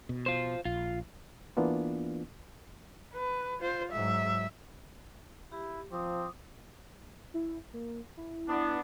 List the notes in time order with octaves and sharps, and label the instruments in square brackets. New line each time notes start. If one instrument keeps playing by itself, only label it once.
[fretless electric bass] B2
[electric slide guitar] F4 C5
[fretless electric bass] A#1 [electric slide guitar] F4
[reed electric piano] E3 A#3 B3 D4 F4
[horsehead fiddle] B4
F4 C5
[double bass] G#2 F#3 [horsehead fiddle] E5
[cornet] E4 [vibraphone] G4
[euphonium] F3 [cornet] C4 [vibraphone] D6 D#6
[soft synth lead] E4
A#3
E4
[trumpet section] B3 D4